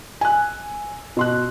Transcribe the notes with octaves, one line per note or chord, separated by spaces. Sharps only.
G#5 F#6
B2 C6 F#6